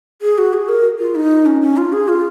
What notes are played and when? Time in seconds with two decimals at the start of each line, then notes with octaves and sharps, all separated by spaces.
0.22 G#4
0.38 F#4
0.53 G#4
0.69 A#4
0.99 F4
1.15 D#4
1.46 C#4
1.62 C#4
1.77 F4
1.93 G#4
2.08 F4